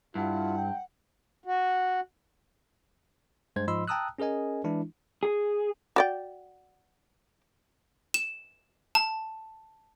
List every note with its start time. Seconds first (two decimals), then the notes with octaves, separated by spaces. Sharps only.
0.15 G2 E4 F4 F#5
0.57 G5
1.45 F#4
3.56 G2 G#3 C5 G#6
3.68 G#2 F3 D#5 B5 C6 E6
3.88 G5 A5 A#5 D#6 E6 F#6
4.18 C#4 G#4 A#4 D#5 G#5
4.64 E3 G#3 D4 E4
5.23 G#4
5.96 F#4 D5 G5
8.14 E7
8.95 A5